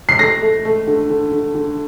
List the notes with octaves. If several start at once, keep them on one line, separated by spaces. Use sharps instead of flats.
C7
A3 A#6
A3
A3
D3
D3
D3
D3